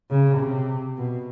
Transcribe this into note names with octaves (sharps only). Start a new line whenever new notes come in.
C#3
C3
B2